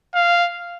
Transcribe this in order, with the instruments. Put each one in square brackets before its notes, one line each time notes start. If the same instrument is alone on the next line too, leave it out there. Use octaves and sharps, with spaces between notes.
[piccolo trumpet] F5